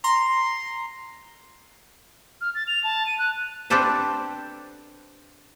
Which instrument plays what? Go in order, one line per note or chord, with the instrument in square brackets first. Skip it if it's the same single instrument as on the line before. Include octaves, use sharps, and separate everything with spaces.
[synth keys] A#5 C6
[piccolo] F6
A6
F7
A5
D#7
F#6
[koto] C4 D4 G4 A4 B4 C5